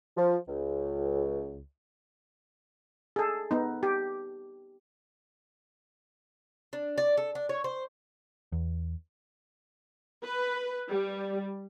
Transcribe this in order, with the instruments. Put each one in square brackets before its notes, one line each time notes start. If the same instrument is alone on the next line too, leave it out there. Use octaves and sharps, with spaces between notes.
[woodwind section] F3
C#2
[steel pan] G#4 A4
B3 D#4
G4
[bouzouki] D4
D5
A4
D4
C#5
C5
[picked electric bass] E2
[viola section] B4
G3